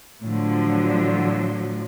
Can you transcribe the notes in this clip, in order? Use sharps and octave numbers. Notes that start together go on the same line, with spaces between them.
A2 D3 F3 F#3